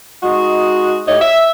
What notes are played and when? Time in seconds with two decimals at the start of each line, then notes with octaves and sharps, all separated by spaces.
0.23 G#3 D#4 F#4
1.08 A2 G4 C#5 D#5
1.21 E5